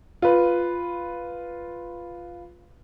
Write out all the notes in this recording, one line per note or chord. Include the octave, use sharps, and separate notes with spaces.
F4 B4